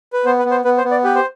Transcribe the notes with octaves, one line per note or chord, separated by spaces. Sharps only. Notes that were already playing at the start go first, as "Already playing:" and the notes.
B4
B3 C5
B4
B3
C5
B3 B4
C5
B3
D5
G4 B4
C5